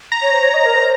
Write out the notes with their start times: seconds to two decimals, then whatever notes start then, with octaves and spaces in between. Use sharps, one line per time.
0.12 A#5
0.22 C#5
0.33 C5
0.43 C#5
0.54 D#5
0.65 A#4
0.76 C5